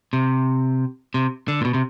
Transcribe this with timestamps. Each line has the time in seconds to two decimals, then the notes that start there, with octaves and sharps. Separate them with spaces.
0.13 C3
1.14 C3
1.48 D3
1.61 A#2
1.65 B2
1.74 C3